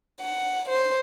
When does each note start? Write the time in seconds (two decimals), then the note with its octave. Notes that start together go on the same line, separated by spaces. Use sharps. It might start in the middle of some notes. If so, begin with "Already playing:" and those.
0.19 F#5
0.68 C5